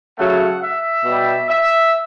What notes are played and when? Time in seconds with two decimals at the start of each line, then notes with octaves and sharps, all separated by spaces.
0.17 C#3 F#3 A3 F#5
0.61 E5
1.05 B2 G3
1.49 E5